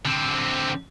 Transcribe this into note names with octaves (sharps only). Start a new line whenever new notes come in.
D3 C4